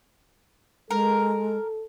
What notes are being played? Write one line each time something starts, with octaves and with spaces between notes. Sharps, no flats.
G#3 A4 A#4